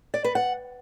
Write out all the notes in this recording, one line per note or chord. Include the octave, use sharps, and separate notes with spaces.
D5
B4
F#5